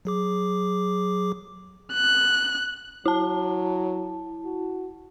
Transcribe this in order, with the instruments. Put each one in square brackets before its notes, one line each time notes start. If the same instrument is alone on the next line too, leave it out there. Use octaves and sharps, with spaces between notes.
[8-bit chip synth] F#3 G#4 D6
[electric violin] F#6
[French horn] F#3 [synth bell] E4 A5
[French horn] F#4